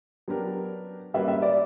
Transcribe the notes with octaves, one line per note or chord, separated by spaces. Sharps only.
F#3 B3 D4 G4 A#4
G3 A#3 C#4 F#4 B4 E5
E5
D5